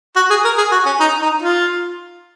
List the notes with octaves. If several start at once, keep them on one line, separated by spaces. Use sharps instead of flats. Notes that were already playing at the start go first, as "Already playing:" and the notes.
F#4
G#4
A#4
G#4
F#4
C#4
D#4
D#4
F4